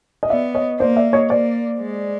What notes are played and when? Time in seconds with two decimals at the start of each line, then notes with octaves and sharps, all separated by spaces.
0.23 D#5
0.29 B3 D5 E5
0.55 C#5 D#5
0.80 A#3 C5 D5
0.96 D5 E5
1.13 C#5 D#5
1.30 A#3 C5 D5
1.80 G#3